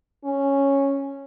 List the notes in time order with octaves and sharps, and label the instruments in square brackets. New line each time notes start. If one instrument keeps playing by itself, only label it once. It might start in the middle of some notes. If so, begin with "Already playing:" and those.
[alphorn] C#4